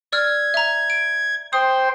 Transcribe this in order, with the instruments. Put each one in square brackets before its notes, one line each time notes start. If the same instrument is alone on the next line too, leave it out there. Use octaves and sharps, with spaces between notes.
[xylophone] D5 E6 F6 [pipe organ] G#6
[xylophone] E5 A#5
D7
[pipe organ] C5 G5 C6 [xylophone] D#6